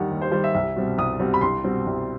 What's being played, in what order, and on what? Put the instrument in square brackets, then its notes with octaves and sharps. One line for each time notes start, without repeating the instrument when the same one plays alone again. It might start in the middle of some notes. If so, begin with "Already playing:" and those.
Already playing: [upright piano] D#2 D#3 G3 F#5
D#2
C5
D#3 G3 C5
E5
C2 E5
B2 G3 C4
C2 D#6
B2 G3 C4
B5
C2 C6
B2 G3 C4
C2